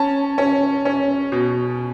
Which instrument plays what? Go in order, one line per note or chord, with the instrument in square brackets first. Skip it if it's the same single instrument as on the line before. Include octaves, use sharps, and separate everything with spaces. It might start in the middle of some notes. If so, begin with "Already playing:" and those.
Already playing: [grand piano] C#4 A5
C#4
C#4
B2